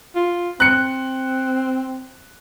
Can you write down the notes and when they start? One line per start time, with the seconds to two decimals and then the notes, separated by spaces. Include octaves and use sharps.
0.15 F4
0.60 C4 F#6 C#7